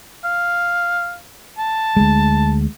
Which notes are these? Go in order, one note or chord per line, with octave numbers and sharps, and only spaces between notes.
F5
A5
D2 G#3